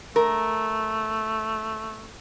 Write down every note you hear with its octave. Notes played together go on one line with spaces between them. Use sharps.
A3 A#4